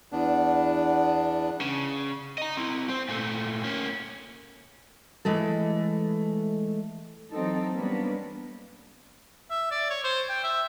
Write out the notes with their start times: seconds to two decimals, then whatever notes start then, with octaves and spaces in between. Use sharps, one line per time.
0.12 E2 B3 D4
1.61 C#3
2.38 D#5 A#5
2.57 C4 E4
2.89 C4 C5
3.09 A#2 A3
3.64 A#3 C#4
5.25 E3 G#3 A3 A4
7.32 E3 F#3 C4 D#4 A4
7.74 G3 A#3 B3 C#4 D4 B4
9.51 E5
9.71 D5
9.90 C#5
10.04 C5
10.29 G5
10.44 E5